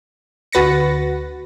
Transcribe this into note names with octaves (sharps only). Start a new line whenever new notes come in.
D2 F#4 B4 A6 A#6 C#7